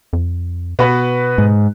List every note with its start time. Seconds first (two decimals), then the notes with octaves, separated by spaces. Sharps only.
0.13 F2
0.79 B2 B3 F#4 B4
1.38 G#2